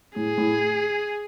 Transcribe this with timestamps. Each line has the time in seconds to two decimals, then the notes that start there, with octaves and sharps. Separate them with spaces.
0.16 A2 G#4
0.38 A2